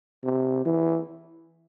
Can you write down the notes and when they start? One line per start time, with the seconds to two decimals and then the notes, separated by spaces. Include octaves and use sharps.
0.24 C3
0.66 E3